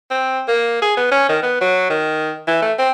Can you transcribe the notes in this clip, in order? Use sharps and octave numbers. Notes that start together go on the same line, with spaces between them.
C4
A#3
G#4
B3
C#4
D#3
B3
F#3
D#3
E3
A3
C4